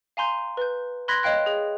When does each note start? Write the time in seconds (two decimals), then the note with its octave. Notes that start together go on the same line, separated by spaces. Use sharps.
0.17 F5 G#5 A#5 C6 G6
0.57 B4 G6
1.08 B5 C6 F#6 G#6 A#6 B6
1.23 C#5 D#5 F5 G5 F#6
1.46 G#4